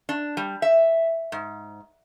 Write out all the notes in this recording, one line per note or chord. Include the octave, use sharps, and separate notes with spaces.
D4
G3
E5
G#2